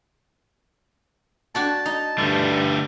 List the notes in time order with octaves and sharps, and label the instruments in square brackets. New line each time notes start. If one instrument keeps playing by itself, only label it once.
[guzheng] D4 F#4 G5 [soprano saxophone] A5
[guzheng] D#4
[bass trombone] G2 [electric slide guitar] D3 G3 A3